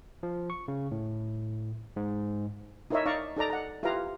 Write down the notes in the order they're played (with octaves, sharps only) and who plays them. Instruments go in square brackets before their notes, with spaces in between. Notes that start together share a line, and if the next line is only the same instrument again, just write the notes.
[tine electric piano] F3
C#6
C#3
A2
G#2
[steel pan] D#4 E4 A#4 C#5 D#5 E5
D#4 D5 F5 A#5 C#6
D#4 A4 D5 A#5
F#5 A#5
E4 F4 G4 B4 F5 A#5